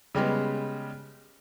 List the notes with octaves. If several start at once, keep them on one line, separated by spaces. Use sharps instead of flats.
C#3 G3 G#3 B3